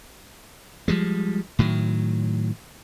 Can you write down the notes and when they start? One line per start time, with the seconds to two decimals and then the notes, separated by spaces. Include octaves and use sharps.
0.88 F3 G3 G#3
1.59 A2 D#3 F#3